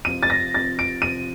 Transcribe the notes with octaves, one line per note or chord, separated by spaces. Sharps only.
F2 C3 F3 D#7
A6
A#6
F2 C3 F3 A6
D7
F2 C3 F3 D#7